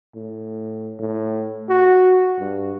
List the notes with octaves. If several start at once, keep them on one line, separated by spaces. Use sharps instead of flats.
A2
A2
F#4
G2